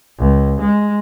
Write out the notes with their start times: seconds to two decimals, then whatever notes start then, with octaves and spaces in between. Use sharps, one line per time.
0.19 C#2
0.61 G#3